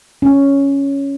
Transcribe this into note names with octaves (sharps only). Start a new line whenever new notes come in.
C#4